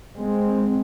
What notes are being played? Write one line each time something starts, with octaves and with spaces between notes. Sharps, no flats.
G#3 C4